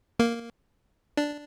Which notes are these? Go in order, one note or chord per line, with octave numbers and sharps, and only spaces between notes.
A#3
D4